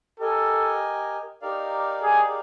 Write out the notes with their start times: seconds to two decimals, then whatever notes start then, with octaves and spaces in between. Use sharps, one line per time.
0.19 G4 A4 A#4 D#5 G#5
1.42 D#4 G4 A#4 D5 F5
2.03 G#4